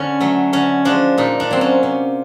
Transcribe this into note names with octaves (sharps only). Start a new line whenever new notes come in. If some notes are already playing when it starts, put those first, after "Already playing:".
Already playing: D3 C#4
F#3 A3
D3 C#4
F3 G#3 D4
A#2 D#4
D4
F#3 A#3 C4
C#4
C3